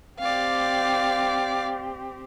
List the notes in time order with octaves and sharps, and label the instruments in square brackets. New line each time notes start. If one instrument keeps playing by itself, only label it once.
[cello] C4 G4 [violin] D5 F5